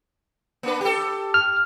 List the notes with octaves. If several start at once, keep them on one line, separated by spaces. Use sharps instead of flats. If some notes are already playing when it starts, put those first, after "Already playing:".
A#3 D4 B4
G4 A4
F6